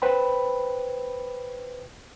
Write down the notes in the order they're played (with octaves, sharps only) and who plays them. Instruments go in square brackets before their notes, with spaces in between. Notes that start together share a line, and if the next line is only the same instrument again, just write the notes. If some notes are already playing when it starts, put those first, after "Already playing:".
[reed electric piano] B4 C5 G5 B5